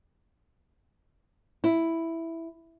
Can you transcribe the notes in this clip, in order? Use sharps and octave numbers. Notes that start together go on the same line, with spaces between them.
E4